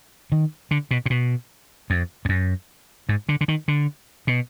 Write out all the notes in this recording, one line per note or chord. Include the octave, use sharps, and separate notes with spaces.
D#3
D3
B2
A#2
B2
F2
F2
F#2
G#2
D3
D3
D#3
D3
B2